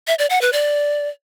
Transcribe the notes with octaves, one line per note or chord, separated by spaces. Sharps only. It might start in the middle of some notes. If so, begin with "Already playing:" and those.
E5
D5
F#5
B4
D5